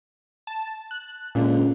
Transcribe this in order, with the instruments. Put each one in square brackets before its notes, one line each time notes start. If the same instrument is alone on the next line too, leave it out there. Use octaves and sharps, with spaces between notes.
[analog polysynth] A5
F#6
[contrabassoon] C#2 [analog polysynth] A#2 D3